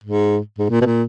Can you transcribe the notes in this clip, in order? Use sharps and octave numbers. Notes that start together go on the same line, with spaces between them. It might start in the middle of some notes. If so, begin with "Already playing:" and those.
G#2
G#2
A#2
B2
A#2